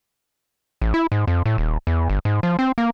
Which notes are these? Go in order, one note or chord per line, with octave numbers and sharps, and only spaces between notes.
A1
E4
G#2
F2
A2
D#1
E2
G1
G#2
F3
C4
A#3